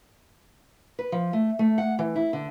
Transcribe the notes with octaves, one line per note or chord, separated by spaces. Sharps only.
B4
F3
A3
A3
F#5
E3
E4
D3